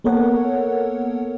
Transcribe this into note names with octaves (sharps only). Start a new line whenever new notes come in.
A#3 B3 A4 A#4 C#5 F#5